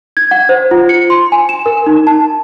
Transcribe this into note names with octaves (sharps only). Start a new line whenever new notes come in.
G#6
F#5
C5
F4
C#7
C6
G#5
E7
A#4
D#4
A5